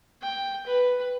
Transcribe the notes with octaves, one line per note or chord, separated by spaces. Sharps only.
G5
B4